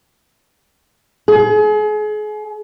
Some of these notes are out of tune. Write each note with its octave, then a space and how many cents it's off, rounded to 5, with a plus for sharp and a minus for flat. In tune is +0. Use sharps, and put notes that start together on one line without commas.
G#4 +35